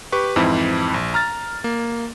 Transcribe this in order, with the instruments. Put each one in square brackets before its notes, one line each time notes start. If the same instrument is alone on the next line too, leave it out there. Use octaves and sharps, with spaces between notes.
[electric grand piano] G4 B4 C#6
F2 G#2 E3 C4 E4
A#1
A#5 F6 A6
A#3